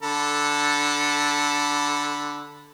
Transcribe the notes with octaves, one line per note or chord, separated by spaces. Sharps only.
D3 A4 B5